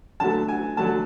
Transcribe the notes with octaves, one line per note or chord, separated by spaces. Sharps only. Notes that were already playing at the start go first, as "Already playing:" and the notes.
D3 F#3 A3 A5
G#5
D3 F#3 A3 A5